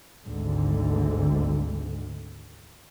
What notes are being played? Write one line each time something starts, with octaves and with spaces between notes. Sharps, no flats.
G#1 D2 G#2 D3